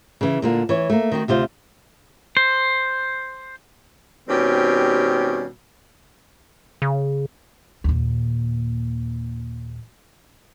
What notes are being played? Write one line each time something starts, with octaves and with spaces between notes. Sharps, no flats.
C#3 E3
A#2 D3 A#3
E3 C#5
A3 A#3
D#3 C4 F#4
D2 C3 F4 C5
C5
B2 D#3 G3 C4 C#4 G4
C#3
D#2 A#2